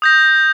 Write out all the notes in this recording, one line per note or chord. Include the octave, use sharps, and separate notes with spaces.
D#6 G6 A#6